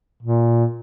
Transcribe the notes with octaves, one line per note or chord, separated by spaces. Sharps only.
A#2